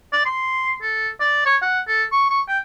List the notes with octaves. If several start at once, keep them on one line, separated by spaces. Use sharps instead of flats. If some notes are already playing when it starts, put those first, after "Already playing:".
D5
C6
A4
D5
C#5
F#5
A4
C#6
C#6
G5